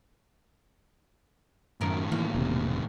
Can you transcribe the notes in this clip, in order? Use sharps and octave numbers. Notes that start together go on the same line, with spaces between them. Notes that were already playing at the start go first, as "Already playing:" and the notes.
F#2 A2 D#3 A#4
E3 A#3
E1 C3